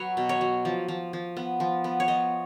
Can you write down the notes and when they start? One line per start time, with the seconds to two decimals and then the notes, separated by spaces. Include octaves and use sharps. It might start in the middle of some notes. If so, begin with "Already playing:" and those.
Already playing: F#3 B4 C#5
0.17 B2
0.29 C#5
0.41 F#3
0.65 F3
0.88 F3
1.13 F3
1.37 B3
1.60 F3
1.84 B3
2.00 C#5
2.08 F3 D#5